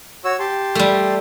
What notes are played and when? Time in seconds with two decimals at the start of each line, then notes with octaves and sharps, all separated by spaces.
0.25 F#4 C#5 E6
0.40 G4 A5 C6
0.75 G3 A3